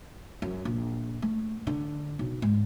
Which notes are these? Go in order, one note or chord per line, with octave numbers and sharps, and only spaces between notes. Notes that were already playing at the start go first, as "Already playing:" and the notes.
F#2
A#1
A3
D3
B1
G#2